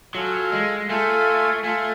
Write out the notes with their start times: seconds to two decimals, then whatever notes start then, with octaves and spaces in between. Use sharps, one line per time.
0.15 F#3 F4 A4 F5 G#5
0.52 G#3
0.89 A3 F4 A4 F5 G#5
1.63 A3 F4 A4 F5 G#5